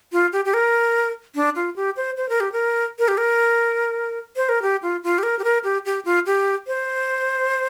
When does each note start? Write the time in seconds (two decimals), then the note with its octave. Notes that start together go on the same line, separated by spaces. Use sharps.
0.12 F4
0.32 G4
0.45 G4
0.54 A#4
1.35 D4
1.56 F4
1.76 G4
1.97 C5
2.17 C5
2.29 A#4
2.40 G4
2.52 A#4
2.99 A#4
3.08 G4
3.17 A#4
4.36 C5
4.49 A#4
4.62 G4
4.82 F4
5.03 F4
5.18 G4
5.23 A#4
5.39 G4
5.44 A#4
5.64 G4
5.85 G4
6.05 F4
6.26 G4
6.67 C5